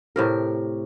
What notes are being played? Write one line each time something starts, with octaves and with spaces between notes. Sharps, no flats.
A2 C3 A#4